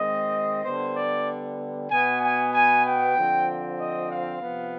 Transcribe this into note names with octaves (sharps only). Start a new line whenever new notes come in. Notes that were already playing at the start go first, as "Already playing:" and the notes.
Already playing: D#3 G#3 C4 D#5
D3 G3 B3 C5
D5
B2 B3 G#5
G#5
G#5
G5
D3 F3 C4
D#5
F5
C3 F3 B3